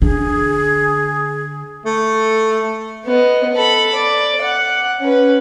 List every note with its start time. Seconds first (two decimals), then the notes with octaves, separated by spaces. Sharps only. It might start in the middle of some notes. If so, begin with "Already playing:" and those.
0.02 D3 G#4
1.86 A3
3.06 B3 D#5
3.53 A4 B5
3.95 D5
4.42 F#5
5.00 C#4 B4